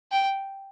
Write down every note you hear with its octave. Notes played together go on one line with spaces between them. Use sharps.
G5